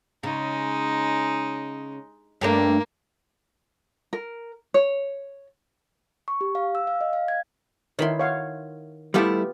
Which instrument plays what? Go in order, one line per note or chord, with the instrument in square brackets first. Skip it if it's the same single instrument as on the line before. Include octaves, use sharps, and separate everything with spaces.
[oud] C#3 [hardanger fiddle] G#3 D#4
[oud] G2 A3 D4 [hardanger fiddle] A#3
[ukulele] A#4
C#5
[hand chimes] C#6
G4
F5
E6
F5
D#5
F5
G#6
[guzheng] D#3 B5 C6 [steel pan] E4 A#4 C#5
[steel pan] C#5 F5 F#5
[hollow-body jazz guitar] G3 A3 E4 [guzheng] B3 F4 G4